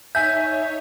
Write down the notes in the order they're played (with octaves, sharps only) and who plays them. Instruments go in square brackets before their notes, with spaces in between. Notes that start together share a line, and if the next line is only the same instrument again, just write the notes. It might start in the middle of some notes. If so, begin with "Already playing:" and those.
[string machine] D#4 C#5 [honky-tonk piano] E5 G#5 B6 [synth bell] G6